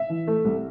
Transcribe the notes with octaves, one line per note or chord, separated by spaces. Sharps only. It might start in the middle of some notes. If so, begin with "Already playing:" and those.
Already playing: E5
E3
A3
C2